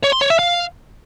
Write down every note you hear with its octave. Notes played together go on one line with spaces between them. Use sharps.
C#5
C6
C#5
E5
F5